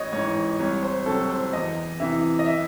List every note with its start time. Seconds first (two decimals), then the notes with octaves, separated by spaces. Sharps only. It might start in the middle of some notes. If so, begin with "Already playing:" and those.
Already playing: A1 C#5 D#5
0.12 G#2 E3 C#5
0.59 C2 C#5
0.83 C5
1.06 C3 F#3 C4 A4
1.29 C5
1.53 E2 D#5
2.00 C3 E3 E5
2.39 D#5
2.46 E5